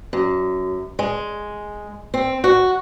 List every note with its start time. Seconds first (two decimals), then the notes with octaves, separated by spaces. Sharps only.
0.13 F#2
0.99 G#3
2.14 C4
2.44 F#4